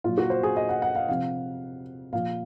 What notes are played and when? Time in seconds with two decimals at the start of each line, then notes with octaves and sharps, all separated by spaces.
0.04 A#2 F#3 F4
0.18 F#4
0.30 C5
0.43 G#4
0.57 D#5
0.69 F#5
0.82 F#5
0.95 F5
1.08 C3 F3 F5
2.13 A#2 F3 F5